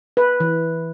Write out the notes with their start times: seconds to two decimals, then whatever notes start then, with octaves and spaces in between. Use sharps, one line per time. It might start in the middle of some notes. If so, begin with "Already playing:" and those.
0.17 B4
0.40 E3